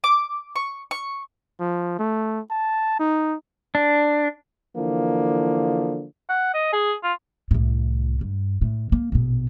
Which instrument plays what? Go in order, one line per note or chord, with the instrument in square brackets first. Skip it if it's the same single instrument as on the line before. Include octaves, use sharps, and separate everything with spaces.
[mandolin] D6
C#6
C#6
[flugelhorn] F3
A3
A5
D#4
[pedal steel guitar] D4
[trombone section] D3 E3 F3 A#3
[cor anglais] F#5
D#5
G#4
F4
[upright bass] C2 A2
G2
A2
A#3
A#1 B2